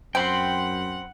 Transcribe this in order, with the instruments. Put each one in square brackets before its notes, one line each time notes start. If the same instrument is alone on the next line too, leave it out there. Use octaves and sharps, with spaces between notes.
[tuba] F#2 [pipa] C4 [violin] F#5 [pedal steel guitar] G5 B5 C6